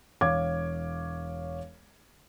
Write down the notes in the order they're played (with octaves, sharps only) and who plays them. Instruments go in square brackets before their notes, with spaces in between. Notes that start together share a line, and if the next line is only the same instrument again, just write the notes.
[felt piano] E1 C#5 F5 D6 G#6